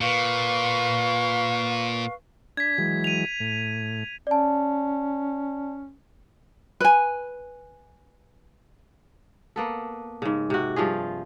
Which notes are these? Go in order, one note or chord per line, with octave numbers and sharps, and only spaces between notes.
A#2 B4 F5 C#6
D4 G#6 B6
E3 F#3 G#3
D#7 F7
A2
C#4 D5 A5
B4 G#5
A#3 B3 A4
G#2 C#3
C3 F#4
G2 F3 F4 G#4